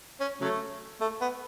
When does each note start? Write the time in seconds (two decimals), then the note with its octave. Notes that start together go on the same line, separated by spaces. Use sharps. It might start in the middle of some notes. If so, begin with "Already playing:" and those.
0.20 C#4
0.41 C#3 F#3 A3
1.01 A3
1.21 B3